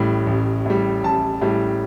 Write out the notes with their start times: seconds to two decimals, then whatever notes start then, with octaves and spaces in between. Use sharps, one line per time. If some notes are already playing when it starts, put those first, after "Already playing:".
Already playing: A1 A2 G3
0.27 A1
0.66 A2 G3
1.03 A1 A5
1.41 A2 G3